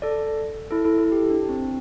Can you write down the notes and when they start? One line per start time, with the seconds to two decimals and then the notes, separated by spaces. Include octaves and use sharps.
0.02 A4 D5
0.71 E4 A4
0.85 E4 A4
0.98 E4 A4
1.12 G4
1.30 D4
1.49 C4